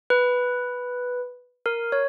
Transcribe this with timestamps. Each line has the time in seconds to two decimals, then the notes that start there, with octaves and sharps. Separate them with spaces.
0.10 B4
1.66 A#4
1.92 C#5